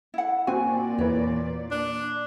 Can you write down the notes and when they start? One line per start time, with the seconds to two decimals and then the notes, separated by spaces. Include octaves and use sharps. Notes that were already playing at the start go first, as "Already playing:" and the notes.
0.14 E4 F#5
0.47 A#2 C4 F#4 D5 G#5
0.99 E2 E3 C#5
1.71 D4